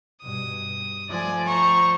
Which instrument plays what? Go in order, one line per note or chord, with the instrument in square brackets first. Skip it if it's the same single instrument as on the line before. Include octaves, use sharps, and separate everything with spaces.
[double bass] G2 B2 [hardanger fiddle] D#6
[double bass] F3 A3 [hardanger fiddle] D5 G#5
[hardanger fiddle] C5 A#5 [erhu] C#6